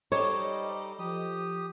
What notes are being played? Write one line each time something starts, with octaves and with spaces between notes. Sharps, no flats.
G3 D#4 A4 C5 C#5 D#5 D6
F3 G4 D#6